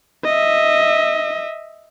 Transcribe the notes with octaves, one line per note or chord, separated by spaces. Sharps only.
D#5 E5